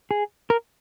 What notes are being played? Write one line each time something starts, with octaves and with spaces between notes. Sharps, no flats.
G#4
A#4